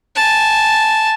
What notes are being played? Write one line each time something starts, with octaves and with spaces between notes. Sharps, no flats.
G#5 A5